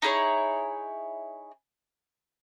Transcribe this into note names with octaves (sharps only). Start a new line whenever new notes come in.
D#4 E4 G#4 C#5